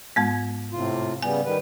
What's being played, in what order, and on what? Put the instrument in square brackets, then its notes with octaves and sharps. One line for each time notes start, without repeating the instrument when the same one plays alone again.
[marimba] G#2 G#3 B3
[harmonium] A2 C3 F4
[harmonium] C#3 G3 B3 [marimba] G#5
[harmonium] D#3 G3 B4